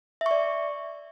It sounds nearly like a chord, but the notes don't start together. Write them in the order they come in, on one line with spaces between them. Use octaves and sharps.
E5 C#6 D5